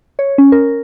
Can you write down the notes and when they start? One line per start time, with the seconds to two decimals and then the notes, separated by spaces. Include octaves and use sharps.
0.19 C#5
0.38 C#4
0.52 A#4